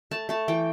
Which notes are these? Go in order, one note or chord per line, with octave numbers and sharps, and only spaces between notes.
A3 A5
A3 A5
E3 G5